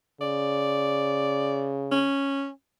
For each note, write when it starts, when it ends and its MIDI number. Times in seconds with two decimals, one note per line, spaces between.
0.21 2.08 49
0.21 1.71 74
1.92 2.50 61